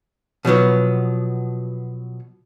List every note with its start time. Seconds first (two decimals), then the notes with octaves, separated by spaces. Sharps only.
0.45 B2 F3 F#3 B3